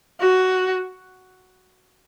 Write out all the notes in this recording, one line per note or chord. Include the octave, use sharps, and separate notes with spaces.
F#4